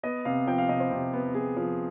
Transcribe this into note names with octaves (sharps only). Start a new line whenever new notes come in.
B3 D#5
C3 F5
F3 G5
F5
C3 D#5
C5
C3
B3
B3 G#4
F3